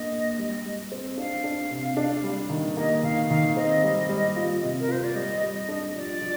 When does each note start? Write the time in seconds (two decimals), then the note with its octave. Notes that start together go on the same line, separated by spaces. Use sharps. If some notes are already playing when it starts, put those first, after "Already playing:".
Already playing: A#3 D4 D#5
0.12 A#3
0.39 G3
0.65 G3
0.92 C4
1.18 D4 F5
1.44 D4
1.70 C3
1.97 D4
2.23 G3
2.50 D#3
2.77 A#3 D#5
3.03 D#3 F5
3.30 D#3 F5
3.57 C4 D#5
3.84 G3
4.09 G3
4.36 F4
4.63 C3
4.80 A#4
4.88 F4 C5
5.04 D5
5.15 G3 D#5
5.42 G3
5.55 D#5
5.69 D4
5.95 F3 D5
6.21 F3